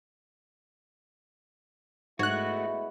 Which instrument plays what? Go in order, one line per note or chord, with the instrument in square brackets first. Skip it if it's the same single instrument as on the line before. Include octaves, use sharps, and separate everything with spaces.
[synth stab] G#2 F#6 [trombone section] G#3 B3 E4 [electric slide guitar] A3 F#4 [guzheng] C#5